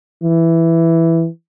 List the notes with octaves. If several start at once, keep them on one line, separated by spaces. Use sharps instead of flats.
E3